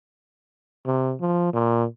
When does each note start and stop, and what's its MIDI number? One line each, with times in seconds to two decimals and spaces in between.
0.86 1.14 48
1.20 1.50 53
1.54 1.85 46